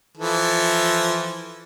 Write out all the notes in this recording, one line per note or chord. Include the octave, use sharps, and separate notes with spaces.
E3 F3 A4